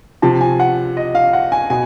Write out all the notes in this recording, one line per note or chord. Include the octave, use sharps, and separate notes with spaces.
C3 F3 A5
G#5
F#5
D#5
F5
F#5
G#5
B2 G#5